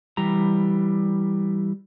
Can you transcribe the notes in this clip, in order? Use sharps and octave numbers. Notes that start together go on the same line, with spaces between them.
E3 G3 A#5